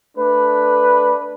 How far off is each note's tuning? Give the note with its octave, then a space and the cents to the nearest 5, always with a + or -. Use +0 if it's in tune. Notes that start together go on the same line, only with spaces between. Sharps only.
A3 +0 D4 +0 B4 +0